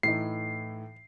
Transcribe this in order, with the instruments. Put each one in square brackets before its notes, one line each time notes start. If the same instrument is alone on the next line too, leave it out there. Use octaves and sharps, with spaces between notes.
[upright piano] A2 E3 D#4 [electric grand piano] C7